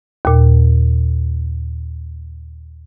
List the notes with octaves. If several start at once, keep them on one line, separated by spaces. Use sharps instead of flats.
D#2 A#2